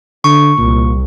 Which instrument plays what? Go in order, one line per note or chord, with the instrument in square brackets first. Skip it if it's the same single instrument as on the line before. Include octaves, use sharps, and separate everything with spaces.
[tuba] D3 [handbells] C#6
[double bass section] C2 [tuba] A#2